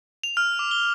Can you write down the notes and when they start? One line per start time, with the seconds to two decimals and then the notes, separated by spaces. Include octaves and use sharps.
0.24 F7
0.37 F6
0.59 D6
0.71 G7